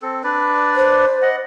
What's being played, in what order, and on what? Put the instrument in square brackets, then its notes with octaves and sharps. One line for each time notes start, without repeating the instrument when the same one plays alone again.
[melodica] C4 A4
D4 B4 D5
[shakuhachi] C5
[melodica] D#5 F#5